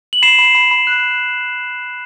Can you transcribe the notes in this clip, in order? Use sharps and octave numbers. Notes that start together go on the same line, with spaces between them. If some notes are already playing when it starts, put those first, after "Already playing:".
F#7
B5 C7 E7
B5
B5
B5
F#6